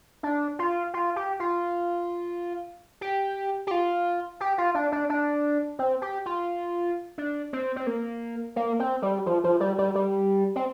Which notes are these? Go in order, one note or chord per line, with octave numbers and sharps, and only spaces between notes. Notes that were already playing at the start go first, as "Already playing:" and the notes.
D4
F4
F4
G4
F4
G4
G4
F4
G4
F4
D4
D4
D4
C4
G4
F4
D4
C4
C4
A#3
A#3
C4
G3
F3
F3
G3
G3
G3
C4